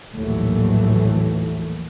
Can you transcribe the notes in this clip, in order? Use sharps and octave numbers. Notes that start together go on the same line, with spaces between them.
A#1 D#2 A2 E3 F#3 A3